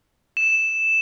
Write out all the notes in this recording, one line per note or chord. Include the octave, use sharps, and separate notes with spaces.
E7